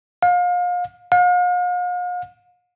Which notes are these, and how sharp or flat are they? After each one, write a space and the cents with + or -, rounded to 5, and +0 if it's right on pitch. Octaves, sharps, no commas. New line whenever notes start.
F5 +35
F5 +45